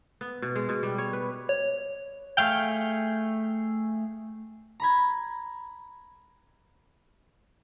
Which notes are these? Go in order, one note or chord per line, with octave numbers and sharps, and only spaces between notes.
B3
B2
G#3
B2
G3
C#5
B4
C#5
A3 G#4 F5 G5
A#5 B5 G#6